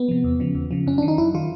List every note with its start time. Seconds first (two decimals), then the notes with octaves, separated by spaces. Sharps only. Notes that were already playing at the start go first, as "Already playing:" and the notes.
Already playing: B3
0.08 C3 F3
0.24 E2
0.40 C#3 F3
0.55 E2
0.71 C#3 F3
0.86 F#2 C#4
0.98 D4
1.02 D#3
1.08 D#4
1.18 F#2 E4
1.34 D#3 F4